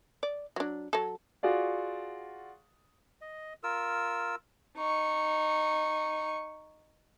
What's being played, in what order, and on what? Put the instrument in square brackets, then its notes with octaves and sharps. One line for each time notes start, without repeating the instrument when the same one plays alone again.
[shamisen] D5
F#3 D4
F#3 A4
[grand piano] F4 F#4 G#4 D5 F5
[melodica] D#5
F4 A#4 E6
[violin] D#4 C#6